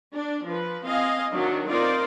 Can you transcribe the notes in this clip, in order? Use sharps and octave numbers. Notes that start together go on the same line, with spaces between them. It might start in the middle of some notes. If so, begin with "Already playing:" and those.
D4
F3 B4
C4 F4 D#5 F5 G#5
D#3 F#3 D4
C4 D#4 F4 A#4 C5 D5